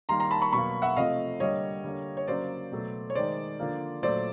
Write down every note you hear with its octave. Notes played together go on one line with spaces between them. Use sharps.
D#3 G3 A#3 A#5 C6
A#5 C6
A5 B5
B5 C#6
B2 F#3 A#3 B5 C#6
E5 F#5
C3 F3 A3 D#5 F5
D3 G3 A#3 C#5 D#5
D3 G3 A#3
C#5
C#3 F#3 A#3 C5 D5
B2 F#3 A3
C#5
D#3 G#3 C5 D5
D3 F3 A#3
A#2 F#3 A3 C5 D5